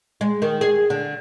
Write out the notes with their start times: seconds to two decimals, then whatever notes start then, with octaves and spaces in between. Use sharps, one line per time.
0.21 G#3
0.42 D#3
0.61 G#4
0.90 D3